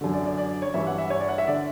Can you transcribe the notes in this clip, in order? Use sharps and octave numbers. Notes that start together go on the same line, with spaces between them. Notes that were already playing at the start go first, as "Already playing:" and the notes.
F#2 D3
D5
D5
D5
D5
C#5
G2 E3 E5
F#5
E5
C#5
D5
F#5
E5
D3 D5